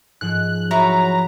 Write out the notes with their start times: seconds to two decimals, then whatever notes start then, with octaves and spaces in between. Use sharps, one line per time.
0.21 G#2 F3 F#6
0.71 F#3 E4 B4 A#5 C#6